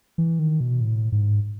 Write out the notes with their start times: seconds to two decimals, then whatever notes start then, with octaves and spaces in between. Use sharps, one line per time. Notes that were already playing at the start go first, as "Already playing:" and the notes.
0.18 E3
0.39 D#3
0.60 B2
0.81 A2
1.12 G#2